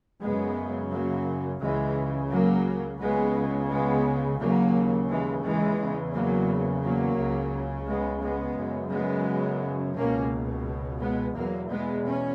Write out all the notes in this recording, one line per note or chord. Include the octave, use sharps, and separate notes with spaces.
F#2 C#3 G#3 B3
F#3 A#3
C#2 C#3 E3 G#3
F#3 A#3
C#2 C#3 G#3 B3
G#3 B3
D#2 C#3 F#3 A#3
E3 G#3
E3 G#3
E2 C#3
F#3 A#3
F#3 A#3
C#2 C#3
G#3 B3
G#3 B3
F#2 C#3
G#3 B3
C#2 B2 A#3 C#4
G#3 B3
E2 B2 F#3 A#3
G#3 B3
C#4